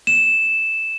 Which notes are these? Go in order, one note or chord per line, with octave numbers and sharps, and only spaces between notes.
E7